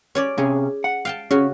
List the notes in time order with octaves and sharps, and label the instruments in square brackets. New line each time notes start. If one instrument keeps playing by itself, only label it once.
[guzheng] C#4 C#5 D5
[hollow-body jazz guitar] C3 C#4 [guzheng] G#4
[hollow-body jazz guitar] F#5
[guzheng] F5 G5 A5
[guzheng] C#3 F#4 [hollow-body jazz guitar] C#4